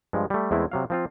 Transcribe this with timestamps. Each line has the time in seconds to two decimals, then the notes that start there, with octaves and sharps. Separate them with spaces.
0.13 G2 F3 G#3
0.30 G3 A3
0.51 E2 G#3 A3 C4 E4
0.72 C3 F#3 F5
0.90 F3 C4 F4